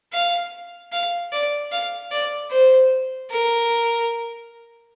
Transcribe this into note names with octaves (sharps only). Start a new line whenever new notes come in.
F5
F5
D5
F5
D5
C5
A#4